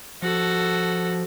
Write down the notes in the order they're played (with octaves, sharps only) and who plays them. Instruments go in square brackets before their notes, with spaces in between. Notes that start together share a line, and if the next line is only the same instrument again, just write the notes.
[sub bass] F3 [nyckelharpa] F#4 A4